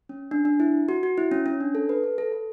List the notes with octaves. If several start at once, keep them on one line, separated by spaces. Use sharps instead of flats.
C#4
D4
D4
E4
F#4
F#4
E4
C#4
C#4
D4
A4
B4
A4
A4
A4